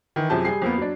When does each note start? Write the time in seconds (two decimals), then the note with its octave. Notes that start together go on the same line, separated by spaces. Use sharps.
0.16 D#3 E3
0.30 F#2 C3 F3 G#4 A5 G6
0.45 G3 G#4 C7
0.62 F2 A#3 B3
0.78 F#3 D4